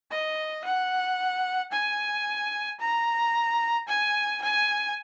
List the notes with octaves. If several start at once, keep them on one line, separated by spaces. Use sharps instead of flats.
D#5
F#5
G#5
A#5
G#5
G#5